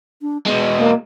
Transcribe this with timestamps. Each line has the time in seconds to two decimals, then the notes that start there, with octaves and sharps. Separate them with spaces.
0.22 D4
0.46 B2 G#3 B3
0.78 A#3